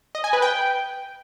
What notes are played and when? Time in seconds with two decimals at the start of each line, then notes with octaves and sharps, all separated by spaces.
0.15 D#5
0.24 G#5
0.33 B4
0.42 G5